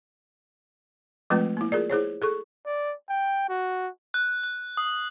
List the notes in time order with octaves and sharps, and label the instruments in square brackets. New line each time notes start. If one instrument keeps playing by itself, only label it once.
[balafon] F3 G#3 A3 C4 F4 B4
A#3 E4
F4 G#4 A#4 D5
E4 G#4 C5 C#5
G#4 A4 C#6
[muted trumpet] D5
G5
F#4
[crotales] F#6
F#6
D#6